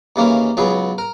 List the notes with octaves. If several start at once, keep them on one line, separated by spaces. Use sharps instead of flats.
D#2 C#3 E3 A#3 C#4
C#2 C#3 F#3 B3 G#4
A#4